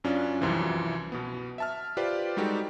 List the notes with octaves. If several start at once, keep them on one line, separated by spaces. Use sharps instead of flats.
F#2 C#4 D4 F4 D5
C2 F#2 C3 E3 F3
B2 B3
E5 A5 F6
F4 G4 B4 C5 D5
G3 G#3 D#4 F#4 G4 A4